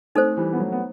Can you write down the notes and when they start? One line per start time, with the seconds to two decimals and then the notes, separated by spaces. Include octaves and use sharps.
0.15 A3 C4 D#4 A4 C5
0.37 E3 G3
0.53 B3
0.60 F#3 A3
0.72 B3